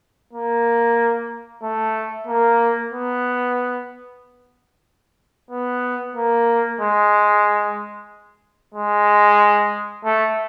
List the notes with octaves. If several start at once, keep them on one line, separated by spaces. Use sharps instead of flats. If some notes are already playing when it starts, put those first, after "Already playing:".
A#3
A3
A#3
B3
B3
A#3
G#3
G#3
A3